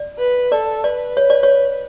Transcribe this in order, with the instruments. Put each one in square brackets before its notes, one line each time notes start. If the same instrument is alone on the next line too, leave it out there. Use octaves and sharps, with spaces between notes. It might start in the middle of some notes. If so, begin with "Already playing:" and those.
Already playing: [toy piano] D5
[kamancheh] B4
[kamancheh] A4 [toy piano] D5
[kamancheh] B4 [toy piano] D5
[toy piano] C#5
D5
C#5